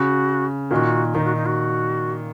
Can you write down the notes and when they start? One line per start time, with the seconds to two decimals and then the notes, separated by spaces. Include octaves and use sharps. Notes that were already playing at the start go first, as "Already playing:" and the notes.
Already playing: C#3 F#4
0.71 A#2 D#3 F#4
1.14 A#2 D#3 D#4
1.25 F#4
1.36 D#4
1.46 F#4